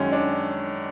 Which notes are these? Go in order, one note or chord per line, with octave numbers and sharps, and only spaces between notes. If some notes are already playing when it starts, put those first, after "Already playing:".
Already playing: F#2 D#3 G#3 C#4
D4